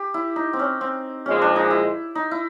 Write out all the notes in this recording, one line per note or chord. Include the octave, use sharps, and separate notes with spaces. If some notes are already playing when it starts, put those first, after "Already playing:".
Already playing: G4
E4
D#4
C4
C#4
C4
A#2 F3 G#3 C#4
D4
D#4
E4
D#4
E4